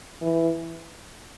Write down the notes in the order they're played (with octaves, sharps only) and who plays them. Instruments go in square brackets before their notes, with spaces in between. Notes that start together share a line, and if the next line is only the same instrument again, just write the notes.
[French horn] E3